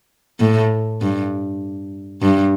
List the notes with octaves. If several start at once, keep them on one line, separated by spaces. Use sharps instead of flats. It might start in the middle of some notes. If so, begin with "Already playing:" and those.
A2
G2
G2